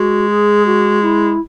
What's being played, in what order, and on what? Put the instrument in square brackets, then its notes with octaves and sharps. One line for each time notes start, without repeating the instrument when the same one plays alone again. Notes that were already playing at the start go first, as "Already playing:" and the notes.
Already playing: [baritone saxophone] G#3 [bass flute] F#4
[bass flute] G#4
F#4
E4